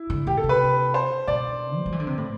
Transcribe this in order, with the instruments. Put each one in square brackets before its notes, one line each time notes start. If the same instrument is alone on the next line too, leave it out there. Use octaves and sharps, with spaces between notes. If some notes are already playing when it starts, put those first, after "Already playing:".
Already playing: [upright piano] E4
[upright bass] D3
[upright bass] B2 [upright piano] G4
[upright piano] A4
[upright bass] C3
[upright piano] B4
C5
[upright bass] B2 [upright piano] D5
[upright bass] G3
F#3
E3
D3
C3
A2